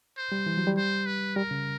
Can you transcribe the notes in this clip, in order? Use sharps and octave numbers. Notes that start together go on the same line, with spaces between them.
C5
G3
E3
F#3
G3
C5
B4
G3 A#4
C#3